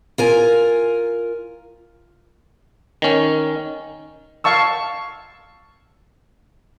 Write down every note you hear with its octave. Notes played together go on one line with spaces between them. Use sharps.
F4 A#4 G#5
D#3 C#4
F5 A5 C#6 E6